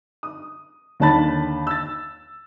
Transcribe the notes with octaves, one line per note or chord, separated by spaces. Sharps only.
D#6
D#2 D3 C#5 A5 B5 A6
E6 A6